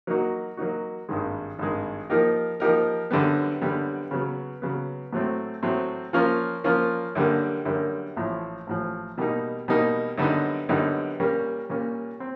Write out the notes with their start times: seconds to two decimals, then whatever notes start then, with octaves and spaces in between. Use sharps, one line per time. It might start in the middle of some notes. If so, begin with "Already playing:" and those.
0.07 F#3 A#3 D#4 F#4
0.57 F#3 A#3 D#4 F#4
1.09 G#1 G2 D#3 G#3
1.59 G#1 G2 D#3 G#3
2.10 F3 A#3 D#4 G4 A#4
2.60 F3 A#3 D#4 G4 A#4
3.11 F#2 D3 G3 B3
3.61 F#2 D3 G3 B3
4.11 C#3 F#3 B3
4.62 C#3 F#3 B3
5.13 A2 F#3 A3 C4
5.63 A2 F#3 A3 C4
6.13 F3 A#3 C#4 F4 A#4
6.64 F3 A#3 C#4 F4 A#4
7.15 F#2 D3 G3 A#3
7.65 F#2 D3 G3 A#3
8.16 A1 A2 F3
8.67 A1 A2 F3
9.18 B2 G3 A#3 D#4
9.68 B2 G3 A#3 D#4
10.18 F#2 D3 G3 B3 D#4
10.69 F#2 D3 G3 B3 D#4
11.19 A#2 G3 A#3 C#4
11.69 A#2 G3 A#3 C#4
12.20 C4